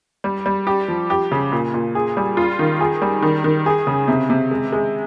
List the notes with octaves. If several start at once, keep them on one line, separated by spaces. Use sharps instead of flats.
G3
G3
G4
F3
G4
C#3
A#2
A#2
G#4
G3
F4
D#3
G#4
G3
D#3
D#3
G#4
C#3
C3
C3
G#3
G#3